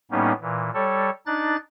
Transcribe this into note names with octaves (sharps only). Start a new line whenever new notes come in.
A2 G3 A#3 B3 C#4 D#4
A#2 E3
G3 A4 C#5
D4 D#4 F#6 A6